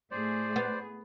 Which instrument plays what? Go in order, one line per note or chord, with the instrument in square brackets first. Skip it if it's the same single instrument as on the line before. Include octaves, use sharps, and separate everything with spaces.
[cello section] A2 A3 G#4 [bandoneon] C5 D5
[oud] B3